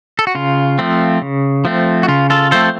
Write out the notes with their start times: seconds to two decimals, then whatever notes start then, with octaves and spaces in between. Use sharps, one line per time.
0.19 A4
0.27 F#4
0.35 C#3 F4
0.79 F3 A3 C4
1.22 C#3
1.65 F3 A3 C4
2.03 F#4
2.08 C#3 F4
2.30 F4 A4
2.51 F3 A3 C4 A4 C5